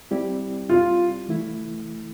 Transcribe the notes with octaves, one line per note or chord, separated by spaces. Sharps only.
G3 C4 E4 G4 D5
F4
E3 A3 E4